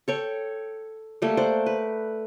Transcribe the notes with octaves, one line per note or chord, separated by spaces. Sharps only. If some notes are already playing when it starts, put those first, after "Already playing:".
A4 C#5 G5
G3 A3 A#3
C5 D5 F#5
B4